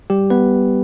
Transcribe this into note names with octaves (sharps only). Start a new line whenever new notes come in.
G3 G4
B3 B4